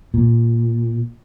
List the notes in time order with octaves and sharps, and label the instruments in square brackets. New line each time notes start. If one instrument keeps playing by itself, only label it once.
[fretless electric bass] A#2